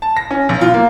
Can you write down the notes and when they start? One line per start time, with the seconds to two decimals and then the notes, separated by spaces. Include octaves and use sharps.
0.02 A5
0.17 A#6
0.31 C#4
0.49 B1
0.61 F4
0.74 A#3